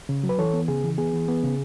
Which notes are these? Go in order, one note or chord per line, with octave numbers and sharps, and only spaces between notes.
C#3
F#3
B4
E3 A4 C#5
B3
C#3 G#4
E3
B3 G#4
E3
B3
C#3